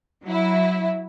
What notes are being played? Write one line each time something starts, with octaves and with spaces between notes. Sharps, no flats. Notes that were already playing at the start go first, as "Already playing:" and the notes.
F#3 E4